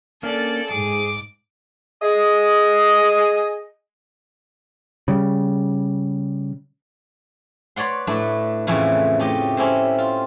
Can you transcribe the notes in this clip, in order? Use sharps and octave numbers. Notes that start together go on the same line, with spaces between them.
A#3 C#4 D4 A4 D5
G#2 G#4 D6
G#4 D#5
C#3 G3
B4 C#5 D5 F#5 C6
A2 A3 D4 B4
F2 A2 C#3 E3 A3
A3 G4 D#5
C4 C#4 E4 G4 C5
F4